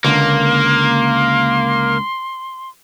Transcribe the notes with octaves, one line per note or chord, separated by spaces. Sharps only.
C#2 D3 A#3 C6